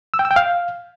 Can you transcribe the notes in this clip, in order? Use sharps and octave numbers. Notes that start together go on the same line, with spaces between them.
E6
G5
E6
G5
F5